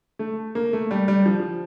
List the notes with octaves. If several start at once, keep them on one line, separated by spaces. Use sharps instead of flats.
A3
A#3
A3
G3
G3
F3
F3